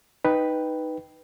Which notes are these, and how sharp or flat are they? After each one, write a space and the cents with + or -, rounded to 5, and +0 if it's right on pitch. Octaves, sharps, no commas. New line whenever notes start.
D#4 +0 B4 +0 G5 +0